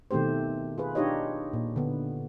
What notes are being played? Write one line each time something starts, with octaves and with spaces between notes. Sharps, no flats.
B2 D#3 A3 C4 G4 C5
F4 G#4 B4
D4 D#4 F4 G4 C#5 D#5
A#2
D3 B3